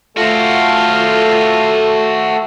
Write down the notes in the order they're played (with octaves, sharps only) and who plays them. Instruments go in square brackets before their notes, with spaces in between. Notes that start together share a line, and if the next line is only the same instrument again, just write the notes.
[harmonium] A3 A4 [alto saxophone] F4 [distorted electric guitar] F#4 C5